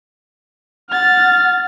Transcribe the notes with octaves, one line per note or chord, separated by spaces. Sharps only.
F#5 F6 A6